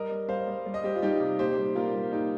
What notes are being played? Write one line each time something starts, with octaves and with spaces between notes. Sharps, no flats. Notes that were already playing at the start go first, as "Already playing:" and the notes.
Already playing: G3 A#4 D#5
G3
G3 C5 F5
G3
G3
D#5
G3 G4 C5
F4
G3 D#4 G4
C3
A#2 G4 C5
G3
A#2 F4 A#4
G3
A#2 D#4 G4